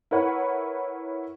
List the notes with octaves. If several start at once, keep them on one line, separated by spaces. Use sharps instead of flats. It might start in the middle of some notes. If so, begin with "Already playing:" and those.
E4 A#4 B4 C#5 F#5